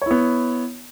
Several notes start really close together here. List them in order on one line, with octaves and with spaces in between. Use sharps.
C#5 E4 B3